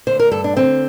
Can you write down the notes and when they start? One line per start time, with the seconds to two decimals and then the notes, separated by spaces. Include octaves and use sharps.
0.07 D3 C5
0.20 A#4
0.31 G2 A4
0.44 D4
0.56 D3 C4